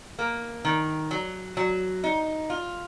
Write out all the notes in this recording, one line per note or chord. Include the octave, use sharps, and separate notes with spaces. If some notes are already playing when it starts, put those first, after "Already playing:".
A#3
D#3
F#3
F#3
D#4
F4